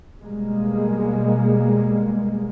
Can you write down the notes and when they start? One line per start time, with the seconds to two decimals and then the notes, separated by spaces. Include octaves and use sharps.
0.21 B2 G3 G#3 A#3